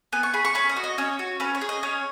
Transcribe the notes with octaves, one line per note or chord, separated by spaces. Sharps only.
B3 G#5
C#6
G#4 B5
C#6
C#4 B5
D#5
F#4
D#5
C#4 C#5
F#4
C#4 B4
C#5
G#4
D#5
C#4 C#5